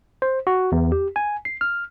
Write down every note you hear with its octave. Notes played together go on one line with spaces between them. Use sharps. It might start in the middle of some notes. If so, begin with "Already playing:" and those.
C5
F#4
E2
G4
G#5
C7
F6